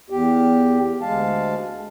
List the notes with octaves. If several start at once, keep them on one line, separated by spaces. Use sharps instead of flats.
E2 G4
D2 G#3 F5 A5